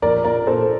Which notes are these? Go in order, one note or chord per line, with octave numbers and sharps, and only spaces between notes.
A#1 A#4 D5
A#2 A#4 D5
A#2 A4 C5